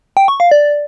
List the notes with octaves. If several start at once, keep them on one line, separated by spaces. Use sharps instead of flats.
G5
C#6
F5
D5